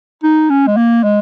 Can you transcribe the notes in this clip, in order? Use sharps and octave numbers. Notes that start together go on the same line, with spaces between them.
D#4
C#4
G#3
A#3
G#3